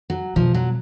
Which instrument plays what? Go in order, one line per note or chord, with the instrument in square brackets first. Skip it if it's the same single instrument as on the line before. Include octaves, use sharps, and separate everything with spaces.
[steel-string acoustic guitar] F#3
[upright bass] B2 [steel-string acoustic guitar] F3
[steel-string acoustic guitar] F#3